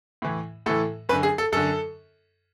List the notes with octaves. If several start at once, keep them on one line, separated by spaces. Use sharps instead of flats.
A2 E3
A2 E3 A4
F#2 D3 B4
G#4
A4
F#2 D3 A4